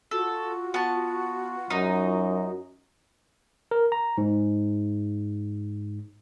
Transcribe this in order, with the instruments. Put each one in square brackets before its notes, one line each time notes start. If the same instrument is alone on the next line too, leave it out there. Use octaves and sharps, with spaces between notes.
[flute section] F4 F#4 [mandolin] A4
[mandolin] B3 A5
[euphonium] F#2 [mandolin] D#4
[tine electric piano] A#4
A#5
G#2